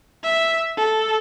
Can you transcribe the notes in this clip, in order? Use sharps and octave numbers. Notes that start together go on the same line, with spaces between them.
E5
A4